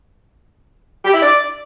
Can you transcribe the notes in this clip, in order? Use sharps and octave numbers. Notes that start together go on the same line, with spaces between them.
G4
E4
D5